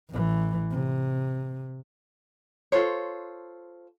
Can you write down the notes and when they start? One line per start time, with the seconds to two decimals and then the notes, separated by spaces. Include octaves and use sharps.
0.10 A1 E3
0.71 C3
2.72 F4 A4 C5 C#5